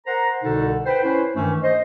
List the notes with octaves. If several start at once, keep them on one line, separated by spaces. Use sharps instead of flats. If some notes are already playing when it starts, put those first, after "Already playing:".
A#4 C5 F#5 A#5
C2 B2 D3 D#4 A4 F#5
B4 C5 G5
C#4 E4 B4 C5
G2 D#3 E3 A3 C#4
C5 D#5